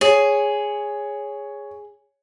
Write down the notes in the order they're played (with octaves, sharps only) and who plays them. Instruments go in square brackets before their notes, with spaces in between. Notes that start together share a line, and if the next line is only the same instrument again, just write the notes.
[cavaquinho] G#4 [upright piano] C#5